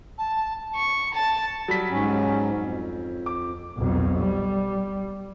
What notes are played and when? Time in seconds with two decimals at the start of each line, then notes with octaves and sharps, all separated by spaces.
0.18 A5
0.75 C#6
1.15 A5
1.68 F#3 G3 B6
1.90 G#2 C#4
2.57 F2
3.26 D6
3.77 B1 F2
4.18 G3